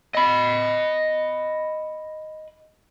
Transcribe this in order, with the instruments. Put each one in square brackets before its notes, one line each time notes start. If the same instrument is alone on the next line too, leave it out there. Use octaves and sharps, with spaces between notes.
[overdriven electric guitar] D#5 B5